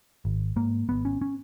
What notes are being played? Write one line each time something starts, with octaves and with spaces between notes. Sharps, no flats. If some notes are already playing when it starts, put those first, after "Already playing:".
G#1
G#2 A#3
G#1 B3
C#4
C#4